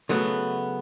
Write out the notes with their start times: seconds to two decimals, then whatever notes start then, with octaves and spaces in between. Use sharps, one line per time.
0.09 C#3 F#3 A3 B3